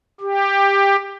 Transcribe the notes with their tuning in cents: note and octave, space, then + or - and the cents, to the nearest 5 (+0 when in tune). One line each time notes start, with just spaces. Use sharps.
G4 +15